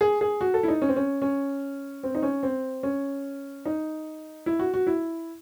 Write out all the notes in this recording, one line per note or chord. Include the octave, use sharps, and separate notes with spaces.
G#4
G#4
F#4
A4
E4
D#4
C#4
C4
C#4
C#4
C4
D#4
C#4
C4
C#4
D#4
E4
F#4
F#4
E4